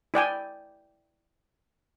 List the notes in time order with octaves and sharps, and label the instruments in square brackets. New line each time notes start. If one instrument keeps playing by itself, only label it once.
[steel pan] E4 D5 G5 G#5